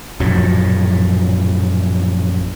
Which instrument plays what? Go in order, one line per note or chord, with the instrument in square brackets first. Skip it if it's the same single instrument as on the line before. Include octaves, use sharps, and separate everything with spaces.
[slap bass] A#1 F#2 A2 F3